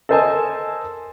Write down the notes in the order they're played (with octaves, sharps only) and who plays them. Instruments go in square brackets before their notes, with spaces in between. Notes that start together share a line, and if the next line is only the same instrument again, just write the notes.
[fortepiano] A4 A#4 C5 D#5 G#5 A5